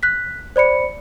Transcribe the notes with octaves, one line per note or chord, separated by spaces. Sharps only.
F#6 B6
C5 D5 B5 C#7